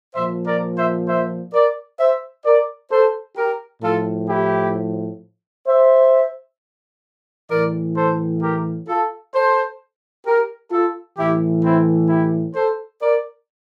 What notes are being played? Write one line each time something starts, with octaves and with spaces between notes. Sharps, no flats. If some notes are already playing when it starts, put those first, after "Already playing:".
A#2 F3 C5 E5
A#4 D5
C5 E5
C5 E5
A#4 D5
C5 E5
A#4 D5
A4 C5
G4 A#4
A2 F3 F4 A4
E4 G4
C5 E5
A2 E3 A#4 D5
A4 C5
G4 A#4
F4 A4
A4 C5
G4 A#4
F4 A4
A2 E3 E4 G4
C4 E4
E4 G4
A4 C5
A#4 D5